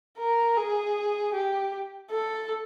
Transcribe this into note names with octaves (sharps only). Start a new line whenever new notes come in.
A#4
G#4
G4
A4